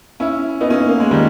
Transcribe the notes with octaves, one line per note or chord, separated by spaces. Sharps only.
C#4 E4
B3 D#4
A#3 C#4
A#3
G#3
D#3 G3